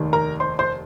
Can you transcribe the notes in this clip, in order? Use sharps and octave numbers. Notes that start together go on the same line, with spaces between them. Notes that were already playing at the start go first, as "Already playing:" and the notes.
Already playing: F1 D#2 D#3
A#4 A#5
C5 C6
C5 C6